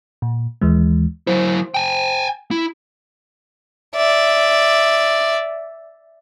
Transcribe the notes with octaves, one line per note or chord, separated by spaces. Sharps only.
A#2
D#2 E3 G#3
F#3 E4 C5
G5 G#5
E4
D5 E5